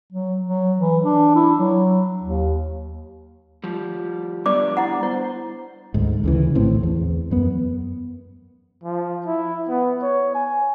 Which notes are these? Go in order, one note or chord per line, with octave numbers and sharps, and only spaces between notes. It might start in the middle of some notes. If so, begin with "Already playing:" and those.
F#3
F#3
E3
D4
E4
F#3
D#2
F3 G3
G3 B3 D4 D5 D6
E4 F#5
E4 C5
D2 G#2
D2 C#3 E3
A#1 A2 C4
E2
F#2 B3
F3
E4
B3
C#5
G#5